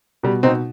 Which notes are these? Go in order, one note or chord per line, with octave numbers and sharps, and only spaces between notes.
B2 G3
B2 C4 D#4